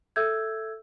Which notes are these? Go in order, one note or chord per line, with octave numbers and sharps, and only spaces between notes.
A4 E5 E6 G6 G#6